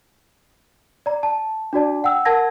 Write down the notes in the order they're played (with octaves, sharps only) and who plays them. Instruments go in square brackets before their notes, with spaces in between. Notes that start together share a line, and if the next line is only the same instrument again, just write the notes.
[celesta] D5 A#5
A5
D4 F#4 D5 A5
F#5 G5 E6
A#4 F#5 A5 G#6 A#6